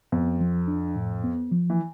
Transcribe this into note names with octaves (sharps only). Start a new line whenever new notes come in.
F2 B3
F3
D4
A2
B3
F3
E3